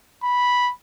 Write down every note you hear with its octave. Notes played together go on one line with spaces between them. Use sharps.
B5